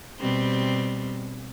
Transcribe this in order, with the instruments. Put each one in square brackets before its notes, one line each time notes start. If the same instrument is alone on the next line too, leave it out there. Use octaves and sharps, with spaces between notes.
[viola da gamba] B2 G3 C4